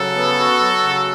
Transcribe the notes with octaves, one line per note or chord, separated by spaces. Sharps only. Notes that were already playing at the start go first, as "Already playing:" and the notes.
Already playing: C#3 F#3 A4
B3
F#4
F#3
C#3